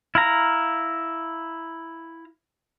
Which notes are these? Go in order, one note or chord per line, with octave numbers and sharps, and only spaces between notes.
E4 F5 A#5